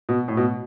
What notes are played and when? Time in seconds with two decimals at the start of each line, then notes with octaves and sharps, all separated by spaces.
0.09 B2
0.28 A2
0.37 B2